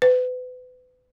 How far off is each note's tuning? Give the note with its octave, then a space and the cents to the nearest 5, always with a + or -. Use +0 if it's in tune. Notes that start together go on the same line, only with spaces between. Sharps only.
B4 +35